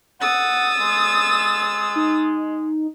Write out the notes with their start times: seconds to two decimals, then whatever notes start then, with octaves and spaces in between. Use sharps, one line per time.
0.20 F#5 D#6 E6 A6
0.80 G#3
1.96 D#4